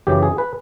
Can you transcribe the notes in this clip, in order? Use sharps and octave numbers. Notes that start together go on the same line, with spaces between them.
F#2 C#3 E3 G4
G#4
B4